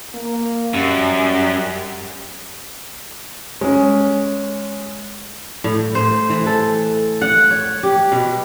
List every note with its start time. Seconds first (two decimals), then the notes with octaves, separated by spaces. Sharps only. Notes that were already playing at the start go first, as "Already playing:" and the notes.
0.15 A#3
0.74 F#2 G3
3.61 G#3 C#4
5.64 A2
5.95 C5
6.30 E3
6.46 A4
7.22 F#5
7.51 C#5
7.83 G4
8.12 B2